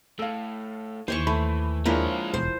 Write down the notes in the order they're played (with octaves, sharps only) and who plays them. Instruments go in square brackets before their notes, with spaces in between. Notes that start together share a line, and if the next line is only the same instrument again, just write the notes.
[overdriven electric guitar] A2 [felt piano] A4 F5
[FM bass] D#2 [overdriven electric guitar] E3 [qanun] C5 G#5 C#6
[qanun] A3 [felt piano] B5
[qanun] F3 E4 A#4 [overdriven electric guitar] G#3 C#5 [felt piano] A#3 D4 G#4
[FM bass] E1 [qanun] C5